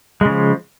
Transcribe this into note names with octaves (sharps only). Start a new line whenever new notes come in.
C#3 F3 G#3